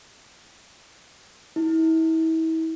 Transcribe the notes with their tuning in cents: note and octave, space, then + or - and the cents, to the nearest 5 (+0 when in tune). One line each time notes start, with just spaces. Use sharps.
E4 -35